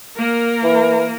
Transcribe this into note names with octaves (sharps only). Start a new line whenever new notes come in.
A#3 A#4
E3